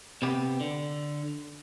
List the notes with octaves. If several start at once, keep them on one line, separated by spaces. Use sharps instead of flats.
C3 B3 G4
D3